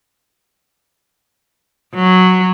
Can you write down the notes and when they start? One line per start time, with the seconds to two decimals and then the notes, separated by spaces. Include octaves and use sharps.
1.95 F#3